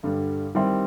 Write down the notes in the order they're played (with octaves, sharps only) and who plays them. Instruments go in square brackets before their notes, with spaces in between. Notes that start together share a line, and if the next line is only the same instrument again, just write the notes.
[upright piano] G2 D3 G3
D#3 G3 C4 E4 G4